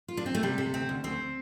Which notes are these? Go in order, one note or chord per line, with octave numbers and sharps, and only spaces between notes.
F4
D4
C4
A3
C3 G3
C3 A4
D2 C4
D2
D2 C4